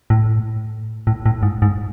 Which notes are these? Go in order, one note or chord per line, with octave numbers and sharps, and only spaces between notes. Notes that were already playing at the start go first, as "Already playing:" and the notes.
A2
A2
A2
G#2
G#2